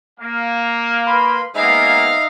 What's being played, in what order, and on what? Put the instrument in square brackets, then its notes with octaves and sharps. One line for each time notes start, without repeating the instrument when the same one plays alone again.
[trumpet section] A#3 F5
[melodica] B4 B5 C6
[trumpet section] G#3 A#3 B3 [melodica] D#4 E5 [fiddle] F5 A#5